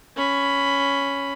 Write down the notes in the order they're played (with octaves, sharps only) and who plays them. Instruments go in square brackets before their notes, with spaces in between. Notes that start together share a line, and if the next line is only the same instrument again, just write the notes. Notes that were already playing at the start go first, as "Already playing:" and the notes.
[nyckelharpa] C#4 B5